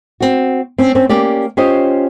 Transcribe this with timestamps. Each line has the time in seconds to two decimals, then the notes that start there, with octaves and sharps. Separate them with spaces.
0.20 C4 F#4
0.78 C4 C#4
0.95 C4 C#4 C5
1.09 A#3 C#4 G4 D5
1.57 C#4 F4 G4 C5 C#5 D#5